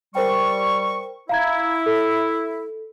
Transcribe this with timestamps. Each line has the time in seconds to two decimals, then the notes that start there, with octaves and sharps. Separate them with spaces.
0.15 G3 A#4 C5 G5 C#6
1.29 E4 F5 A#5 G#6
1.86 A4